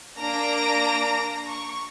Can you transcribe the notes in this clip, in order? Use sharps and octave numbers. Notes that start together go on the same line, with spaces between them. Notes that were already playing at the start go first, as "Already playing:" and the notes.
A#3 D4 A#5 A#6 D7
C#6